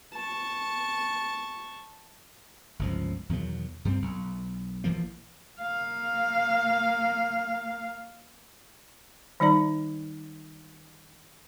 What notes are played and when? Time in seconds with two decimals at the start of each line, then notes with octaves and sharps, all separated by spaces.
0.14 A5 C#6
2.79 G1 C#2 F3
3.29 E2 B2 D#3 F#3
3.85 G2 G3 G#3 C4
4.02 B1
4.84 A#1 E3 F3 A#3
5.60 A#3 F5
9.40 D#3 G3 D#4 D5 A#5